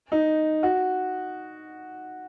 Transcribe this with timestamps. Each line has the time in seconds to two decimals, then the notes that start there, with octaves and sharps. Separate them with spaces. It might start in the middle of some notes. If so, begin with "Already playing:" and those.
0.12 D#4
0.63 F#4